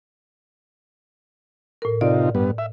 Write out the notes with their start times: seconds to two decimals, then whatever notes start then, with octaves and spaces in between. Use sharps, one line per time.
1.82 A2 A#4
2.01 C3 D#4 F4 D5
2.35 G2 B3
2.58 E5